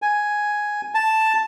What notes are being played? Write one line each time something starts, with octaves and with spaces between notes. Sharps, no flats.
G#5
A5